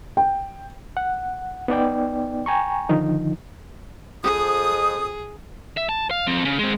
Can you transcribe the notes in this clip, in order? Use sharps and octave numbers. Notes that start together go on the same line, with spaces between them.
G5
F#5
B3 D#4 D5 G5
G5 G#5 A#5 C#6
D3 D#3 F3 D#4
F2 G#4 D#6
E5
A5
F5
F3 C4
C#3
G#3 C4